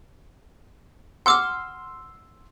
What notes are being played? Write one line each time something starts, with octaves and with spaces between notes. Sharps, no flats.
F#5 C6 D6 E6 F6